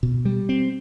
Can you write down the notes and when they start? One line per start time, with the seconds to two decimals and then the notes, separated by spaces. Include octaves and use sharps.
0.03 B2
0.25 G3
0.49 C4